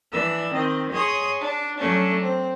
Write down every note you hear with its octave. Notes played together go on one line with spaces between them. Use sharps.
E3 D4 E6
D#3 C4 D#5
G#4 C#5 D#5 C6 D#6
D4
F#3 A3 C#4 D4
C4